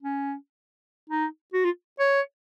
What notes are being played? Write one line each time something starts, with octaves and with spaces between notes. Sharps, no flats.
C#4
D#4
F#4
F4
C#5